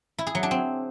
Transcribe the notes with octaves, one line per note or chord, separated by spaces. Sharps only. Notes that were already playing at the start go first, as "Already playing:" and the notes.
E4
G#4
F#3
D4
C4